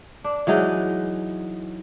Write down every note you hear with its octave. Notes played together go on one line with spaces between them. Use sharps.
D4
E3 F#3 G#3 D#4